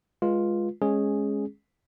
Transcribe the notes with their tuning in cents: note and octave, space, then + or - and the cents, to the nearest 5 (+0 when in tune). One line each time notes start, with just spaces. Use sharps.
G#3 +0 F4 +0 B4 -20
G#3 +0 C#4 -10 G#4 +0